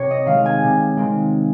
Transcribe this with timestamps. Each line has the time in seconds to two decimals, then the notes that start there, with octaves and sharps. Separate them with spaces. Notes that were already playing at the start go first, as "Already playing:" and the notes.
Already playing: C3 C#5
0.11 D#5
0.26 D#3 G#3 C4 F5
0.46 G#5
0.63 C3
0.97 D#3 G#3 C4